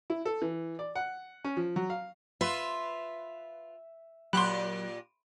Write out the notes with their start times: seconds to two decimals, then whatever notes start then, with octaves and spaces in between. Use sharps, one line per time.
0.10 E4
0.25 A4
0.42 E3
0.79 D5
0.95 F#5
1.44 C#4
1.57 F3
1.76 F#3
1.90 F5
2.41 F4 B4 E5
4.33 A#2 F#3 G4 B5 C6 F#6